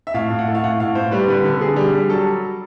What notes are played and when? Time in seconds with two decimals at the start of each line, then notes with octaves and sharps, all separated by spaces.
0.07 E5
0.14 A2 F5
0.30 A2
0.39 F#5
0.47 A3
0.55 F5
0.64 A2 F#5
0.80 A2 F5
0.95 A2 C5
1.11 G3 B4
1.28 D3 B4
1.45 D3 A4
1.61 D3 G#4
1.76 G3
1.94 G3
2.09 F#3 A4